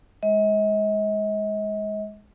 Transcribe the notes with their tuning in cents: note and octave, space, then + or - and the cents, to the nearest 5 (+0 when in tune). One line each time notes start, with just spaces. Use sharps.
G#3 +0 D#5 +40